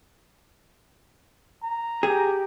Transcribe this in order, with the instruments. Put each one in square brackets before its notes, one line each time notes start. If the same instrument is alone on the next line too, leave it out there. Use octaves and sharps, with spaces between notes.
[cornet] A#5
[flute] G4 [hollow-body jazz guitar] G#4